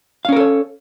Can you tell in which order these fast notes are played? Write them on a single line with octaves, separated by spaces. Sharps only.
F5 C#4 A#4 A4 C#5